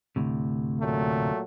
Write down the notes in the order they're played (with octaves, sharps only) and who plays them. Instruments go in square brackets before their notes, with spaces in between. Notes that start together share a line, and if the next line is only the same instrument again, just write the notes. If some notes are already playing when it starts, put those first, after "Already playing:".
[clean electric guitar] D2 A2 C3
[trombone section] A#2 F#3 A3